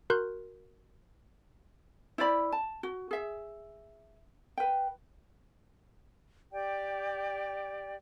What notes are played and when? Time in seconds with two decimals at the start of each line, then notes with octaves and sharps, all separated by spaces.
0.10 F#4 A#4 C6 F#6 G6
2.18 E4 C5 D5 B5
2.52 A5
2.83 F#4
3.11 G#4 E5
4.57 B4 G5
6.52 G4 D5 G5